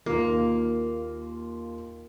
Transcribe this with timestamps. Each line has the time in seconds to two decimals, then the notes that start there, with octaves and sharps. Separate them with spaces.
0.06 D#2 A#3 F4